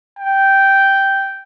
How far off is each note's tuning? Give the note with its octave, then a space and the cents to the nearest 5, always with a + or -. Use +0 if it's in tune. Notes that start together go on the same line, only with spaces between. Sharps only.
G5 -5